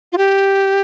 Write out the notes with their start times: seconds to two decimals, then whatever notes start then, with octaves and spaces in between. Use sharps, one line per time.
0.12 F4
0.18 G4